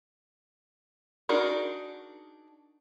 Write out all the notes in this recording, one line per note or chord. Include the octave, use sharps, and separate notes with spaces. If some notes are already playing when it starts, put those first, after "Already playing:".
D4 D#4 F#4 G#4 A#4